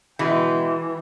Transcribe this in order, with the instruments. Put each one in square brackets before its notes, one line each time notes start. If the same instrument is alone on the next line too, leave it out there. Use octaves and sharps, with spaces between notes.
[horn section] B2 G#3 G5 [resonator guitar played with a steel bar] E3